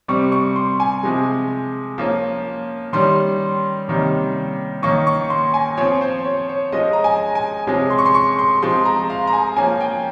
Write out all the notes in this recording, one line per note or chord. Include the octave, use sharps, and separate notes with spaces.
C3 G3 C4 C#6
C#6
C6
G#5
C3 F3 G#3
F3 A#3 C#4
D#3 G3 C#4 C6
C3 D#3 G3 A#3 C#4
D#3 A#3 C#4 C#6
C#6
C6
G#5
F3 C4 C#5
C5
C#5
C#5
F3 G#3 C#4 D#5
A#5
G#5
G#5
C3 F3 G#3 C#4 G#5
C6
C#6
C6
C#6
C6
F3 G#3 C4 C6
A#5
F5
A#5
G#5
F3 A#3 C#4 G#5
G5